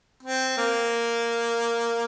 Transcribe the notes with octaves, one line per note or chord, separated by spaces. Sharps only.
C4
A#3